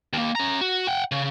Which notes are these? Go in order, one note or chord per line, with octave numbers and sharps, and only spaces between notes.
D#2 A#3
C#4 A#5
F#4
F#5 G5
C#3